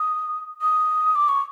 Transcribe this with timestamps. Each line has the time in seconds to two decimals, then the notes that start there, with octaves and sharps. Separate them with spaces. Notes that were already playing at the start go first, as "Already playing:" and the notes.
Already playing: D#6
0.62 D#6
1.15 D6
1.29 C#6